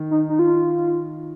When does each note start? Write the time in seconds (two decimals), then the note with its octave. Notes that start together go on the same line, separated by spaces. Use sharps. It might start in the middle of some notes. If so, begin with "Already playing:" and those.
Already playing: D#3
0.11 D#4
0.29 D#4
0.39 F4